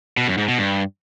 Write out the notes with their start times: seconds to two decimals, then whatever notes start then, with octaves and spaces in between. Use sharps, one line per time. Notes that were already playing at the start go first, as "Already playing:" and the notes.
0.17 B2
0.28 F#2
0.38 G#2
0.48 B2
0.58 G2